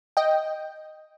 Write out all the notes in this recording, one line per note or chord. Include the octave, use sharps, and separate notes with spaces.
D#5 G5